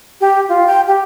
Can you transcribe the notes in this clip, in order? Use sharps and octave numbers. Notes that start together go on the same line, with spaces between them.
G4
F4
G5
G4